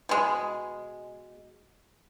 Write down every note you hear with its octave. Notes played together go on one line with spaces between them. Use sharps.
B2 G#3